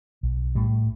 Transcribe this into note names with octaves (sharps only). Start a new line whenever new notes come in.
B1
A2 G3